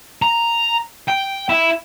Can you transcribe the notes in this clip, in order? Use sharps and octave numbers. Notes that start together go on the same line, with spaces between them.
A#5
G5
E4